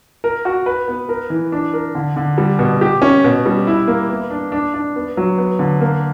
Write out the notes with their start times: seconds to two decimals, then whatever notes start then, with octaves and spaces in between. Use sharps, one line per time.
0.24 A#4
0.45 F#4
0.66 B4
0.88 B3
1.09 A#4
1.30 E3
1.52 D4
1.74 A#4
1.95 D3
2.16 D3
2.38 G3
2.59 B2
2.81 G4
3.02 C#4
3.24 B2
3.46 G3
3.67 E4
3.87 A#3
4.10 B3
4.30 D4
4.52 D4
4.74 D4
4.96 B3
5.17 F#3
5.38 B3
5.59 D3
5.80 A#3